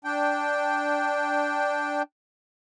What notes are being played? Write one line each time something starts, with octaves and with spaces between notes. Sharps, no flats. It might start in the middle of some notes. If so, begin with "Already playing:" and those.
D4 G5